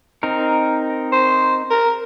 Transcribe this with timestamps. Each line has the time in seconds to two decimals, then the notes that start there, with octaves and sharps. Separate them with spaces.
0.23 C4 D#4 A#4
1.12 C5
1.70 A#4